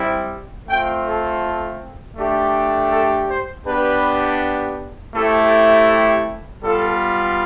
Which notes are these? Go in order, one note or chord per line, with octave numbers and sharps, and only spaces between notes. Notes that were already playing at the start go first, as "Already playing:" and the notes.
Already playing: G3 C4 E4
A3 C4 F4 G5
A4
A3 D4 G4
A4
C5
B3 D4 G4 B4
A3 C4 E4 G4 A4
G4
G3 B3 F4 A4